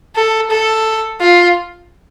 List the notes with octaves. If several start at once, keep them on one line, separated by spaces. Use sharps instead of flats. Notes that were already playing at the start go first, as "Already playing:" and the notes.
A4
A4
F4